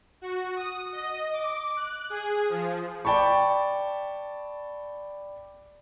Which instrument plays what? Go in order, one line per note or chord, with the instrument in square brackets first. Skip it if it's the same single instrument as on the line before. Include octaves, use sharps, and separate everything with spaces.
[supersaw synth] F#4
D#6
D#5
D6
F#6
G#4
F3
[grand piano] D5 G5 A5 B5 C#6